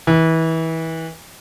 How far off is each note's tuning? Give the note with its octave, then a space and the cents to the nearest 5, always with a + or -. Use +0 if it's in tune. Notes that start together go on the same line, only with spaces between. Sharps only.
E3 -25